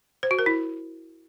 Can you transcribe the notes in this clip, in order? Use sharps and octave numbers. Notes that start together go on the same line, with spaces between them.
C5
F#4
A#4
E4